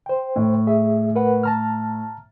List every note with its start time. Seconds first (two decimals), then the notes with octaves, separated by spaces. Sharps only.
0.06 C5 G5
0.36 A2
0.67 G#4 E5
1.15 A#4 B4 F#5
1.43 A5 A#5 F6